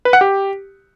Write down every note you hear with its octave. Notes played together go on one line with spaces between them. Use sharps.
B4
F#5
G4